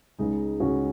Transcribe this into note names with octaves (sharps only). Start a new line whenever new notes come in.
C#2 C#3 G#3 D#4
C#2 C#3 G#3 C#4 F#4